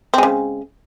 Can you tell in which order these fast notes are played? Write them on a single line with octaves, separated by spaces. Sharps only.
C4 G#3 C#3